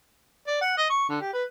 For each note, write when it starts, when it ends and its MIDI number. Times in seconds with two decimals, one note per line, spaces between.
0.47 0.59 74
0.61 0.74 78
0.78 0.86 75
0.90 1.05 85
1.09 1.21 50
1.21 1.30 67
1.33 1.44 71